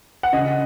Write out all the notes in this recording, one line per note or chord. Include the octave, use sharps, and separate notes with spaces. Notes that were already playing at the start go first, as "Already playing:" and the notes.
F#5
C#3 D#5